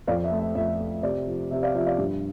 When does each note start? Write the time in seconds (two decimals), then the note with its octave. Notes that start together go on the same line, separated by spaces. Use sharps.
0.07 F2 D5 F5
0.24 E5
0.31 A3
0.39 E5
0.55 F2 E5
0.79 A3
1.03 C3 D5
1.27 F3
1.51 C3 E5
1.63 D5 F5
1.75 F3 E5
1.86 D5 F5
1.98 G2